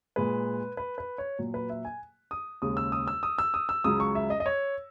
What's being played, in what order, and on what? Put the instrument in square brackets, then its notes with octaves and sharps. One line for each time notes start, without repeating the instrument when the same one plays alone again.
[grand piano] A#2 G#3 B4
B4
B4
C#5
A#2 F#3
B4
E5
G#5
D#6
D#2 C#3 G#3 D#6
E6
D#6
E6
D#6
E6
D#6
E6
C#2 C#3 F#3 D#6
C#6
E5
D#5
D#5
C#5